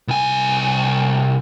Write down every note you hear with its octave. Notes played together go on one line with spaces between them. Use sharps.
C2 G#5